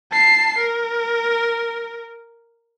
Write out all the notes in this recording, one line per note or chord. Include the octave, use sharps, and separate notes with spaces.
A5 C7
A#4